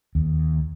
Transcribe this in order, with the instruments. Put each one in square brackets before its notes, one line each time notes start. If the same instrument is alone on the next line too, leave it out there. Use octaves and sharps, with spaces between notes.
[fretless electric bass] D#2